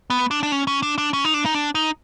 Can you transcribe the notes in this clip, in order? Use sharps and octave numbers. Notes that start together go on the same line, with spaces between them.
B3
D4
D4
C#4
C#4
D4
D4
C#4
D#4
D4
D#4
D4
D#4